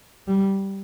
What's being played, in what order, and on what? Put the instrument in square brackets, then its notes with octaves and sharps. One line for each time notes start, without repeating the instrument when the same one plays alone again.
[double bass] G3